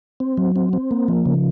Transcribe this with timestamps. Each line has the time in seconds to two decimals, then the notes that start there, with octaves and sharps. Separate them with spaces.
0.20 C4
0.37 F#3
0.56 C4
0.73 C4
0.91 A#3
1.08 F3
1.26 C#3